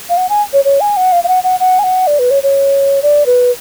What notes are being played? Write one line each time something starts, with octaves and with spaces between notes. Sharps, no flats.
F5
F#5
G#5
C#5
C#5
G#5
F#5
F5
F5
F#5
F#5
F#5
G#5
F#5
D5
B4
C#5
C#5
D5
B4